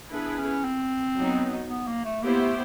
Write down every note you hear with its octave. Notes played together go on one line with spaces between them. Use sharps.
B3 D4 E4 G#4 B4
C#4
C4
F#3 B3 D#4
B3
A#3
A3
A#3 B3 E4 G4 C5
A3